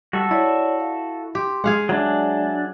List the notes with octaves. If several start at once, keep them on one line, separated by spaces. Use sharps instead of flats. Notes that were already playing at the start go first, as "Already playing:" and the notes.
G3 F#4 A4 E5
E4 C#5 D5
F5
G4 C6
G#3 G#4 F5 F#5
F#3 D4 E5 G#5